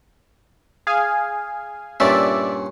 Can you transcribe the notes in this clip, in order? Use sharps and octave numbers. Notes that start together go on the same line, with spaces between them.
G#4 F5 G#5
G2 A#2 C#4 D5 E5